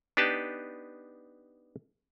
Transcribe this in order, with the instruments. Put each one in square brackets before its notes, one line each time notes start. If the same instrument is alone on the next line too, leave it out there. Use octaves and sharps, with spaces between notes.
[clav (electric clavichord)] B3 D4 D#4 G4 B4 A5